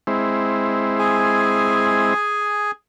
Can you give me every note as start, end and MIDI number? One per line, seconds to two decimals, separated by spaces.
0.07 2.14 56
0.07 2.14 60
0.07 2.14 64
0.99 2.71 68
0.99 2.71 80